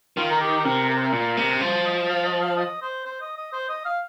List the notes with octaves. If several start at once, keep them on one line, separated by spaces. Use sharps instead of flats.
D#3 F4
A#4
G4
C3 A#4
A#4
C5
A#4
A#2
C3
F3 C5
D#5
F5
D#5
F5
D#5
C5
C5
D#5
D#5
C5
D#5
F5